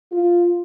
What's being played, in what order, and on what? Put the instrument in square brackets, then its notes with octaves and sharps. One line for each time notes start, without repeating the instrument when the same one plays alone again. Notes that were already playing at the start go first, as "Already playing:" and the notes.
[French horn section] F4